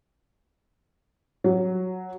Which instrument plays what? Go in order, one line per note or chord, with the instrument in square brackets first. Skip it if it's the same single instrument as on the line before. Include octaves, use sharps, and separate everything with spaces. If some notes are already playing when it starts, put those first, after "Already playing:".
[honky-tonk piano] F#3